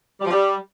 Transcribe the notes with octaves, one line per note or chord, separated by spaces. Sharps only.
G3
F3
G3